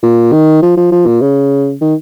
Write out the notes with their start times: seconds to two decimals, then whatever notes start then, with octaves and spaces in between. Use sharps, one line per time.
0.03 A#2
0.33 D#3
0.62 F3
0.77 F3
0.92 F3
1.06 A#2
1.22 C#3
1.81 D#3